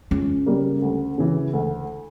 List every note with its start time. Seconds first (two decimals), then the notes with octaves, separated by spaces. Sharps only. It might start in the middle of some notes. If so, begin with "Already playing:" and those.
0.11 C#2 C#4
0.46 C#3 G3 A#3
0.82 D2
1.18 C#3 E3
1.53 D2